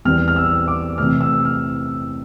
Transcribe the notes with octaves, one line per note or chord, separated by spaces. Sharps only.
E2 E3 G3 C4 F6
F6
E6
D6
C3 E3 A3 F6
E6
F6